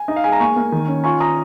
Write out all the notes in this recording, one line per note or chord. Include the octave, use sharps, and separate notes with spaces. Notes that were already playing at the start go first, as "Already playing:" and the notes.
Already playing: G#5
D#4 D#5
F5
G#3 G#5
A#5
A#3 G#5 C#6
A#3
D#3
C#4
F4 G#5 C#6
F4 A#5 D#6